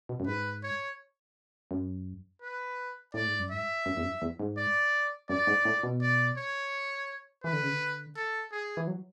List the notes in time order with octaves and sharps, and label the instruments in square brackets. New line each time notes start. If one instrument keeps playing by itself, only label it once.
[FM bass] B2
F#2
[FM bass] G#2 [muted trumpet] B4
[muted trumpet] C#5
[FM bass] F#2
[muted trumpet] B4
[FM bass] A2 [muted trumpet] D5
[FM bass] G#2
F#2
[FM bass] G#2 [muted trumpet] E5
[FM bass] F#2
E2
F#2
E2
G#2
[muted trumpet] D5
[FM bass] F#2 [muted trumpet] D5
[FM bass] G#2
A2
B2
[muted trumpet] D5
C#5
[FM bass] E3 [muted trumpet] B4
[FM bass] D3
C#3
D3
[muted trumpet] A4
G#4
[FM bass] E3
F#3